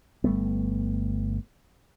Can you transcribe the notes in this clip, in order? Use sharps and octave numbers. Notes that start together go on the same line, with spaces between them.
G1 G3 A3 B3